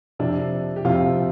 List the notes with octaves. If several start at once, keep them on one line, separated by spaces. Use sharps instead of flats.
F2 C3 D4
G4
F2 C3 F4